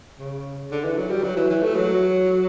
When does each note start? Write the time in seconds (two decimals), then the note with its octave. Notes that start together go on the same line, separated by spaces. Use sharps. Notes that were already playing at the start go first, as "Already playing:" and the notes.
0.19 C#3
0.71 D3
0.84 E3
0.97 F#3
1.11 G3
1.24 F#3
1.37 E3
1.50 E3
1.63 A3
1.76 F#3